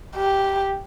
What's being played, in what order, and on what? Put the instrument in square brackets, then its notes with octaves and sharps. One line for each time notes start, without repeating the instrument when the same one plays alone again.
[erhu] G4